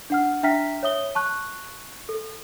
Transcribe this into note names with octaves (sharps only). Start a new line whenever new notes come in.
D4 F#5 F6
D4 E5 G5 A#5 F6 B6
C#5 E5 D#6 G7
A5 C#6 F#6
A4